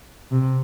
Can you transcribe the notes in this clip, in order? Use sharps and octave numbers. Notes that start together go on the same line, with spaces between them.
C3